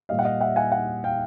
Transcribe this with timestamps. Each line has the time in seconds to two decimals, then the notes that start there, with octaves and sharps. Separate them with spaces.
0.09 A#2 G3 D#5 F5
0.19 F#5
0.25 D#5 F5
0.41 E5 F#5
0.56 F#5 G#5
0.72 F#5 G#5
1.04 F5 G5